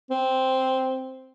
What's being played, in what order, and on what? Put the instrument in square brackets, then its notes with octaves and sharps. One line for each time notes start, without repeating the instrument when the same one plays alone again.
[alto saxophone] C4